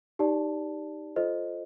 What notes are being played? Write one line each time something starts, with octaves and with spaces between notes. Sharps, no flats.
D#4 G4 D5 A5
F4 A4 C5 D#5